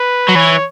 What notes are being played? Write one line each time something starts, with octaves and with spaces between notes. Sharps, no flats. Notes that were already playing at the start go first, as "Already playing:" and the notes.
Already playing: B4
F#3
E3 C#5